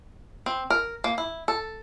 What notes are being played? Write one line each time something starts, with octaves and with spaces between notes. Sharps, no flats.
C4
A#4
A#3
E4
A4